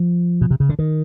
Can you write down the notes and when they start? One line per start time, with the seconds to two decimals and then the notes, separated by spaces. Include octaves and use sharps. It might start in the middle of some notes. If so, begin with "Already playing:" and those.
Already playing: F3
0.41 B2
0.51 C3
0.60 C#3
0.69 D3
0.79 D#3